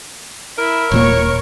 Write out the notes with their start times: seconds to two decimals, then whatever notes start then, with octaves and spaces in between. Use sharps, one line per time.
0.58 E4 A#4
0.91 D#1 A#2 A#3 C#5